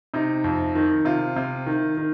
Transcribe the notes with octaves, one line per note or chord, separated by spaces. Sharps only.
C3 D#4
F2
D#3
C3 F4
C3
D#3
D#3